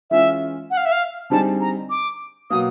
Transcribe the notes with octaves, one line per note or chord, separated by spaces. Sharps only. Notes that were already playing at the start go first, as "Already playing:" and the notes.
E3 G#3 C#4 F4 E5
F#5
F5
E5
F5
D3 G3 C4 D#4 G#4 A5
A#5
D6
B2 F#3 A#3 D#6